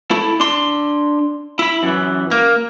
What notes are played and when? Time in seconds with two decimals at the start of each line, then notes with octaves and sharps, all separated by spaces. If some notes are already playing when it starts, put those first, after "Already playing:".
0.11 E4 A4
0.40 D4 C6
1.59 E4 B5
1.83 F#2 E3
2.31 A#3